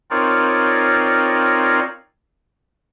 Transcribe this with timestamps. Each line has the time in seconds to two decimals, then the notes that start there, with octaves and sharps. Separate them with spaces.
0.11 C4 D#4 F4 A#4 C#5 D5